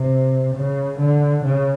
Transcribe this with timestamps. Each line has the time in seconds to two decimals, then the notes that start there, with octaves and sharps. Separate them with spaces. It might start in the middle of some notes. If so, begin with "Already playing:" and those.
Already playing: C3
0.55 C#3
0.99 D3
1.45 C#3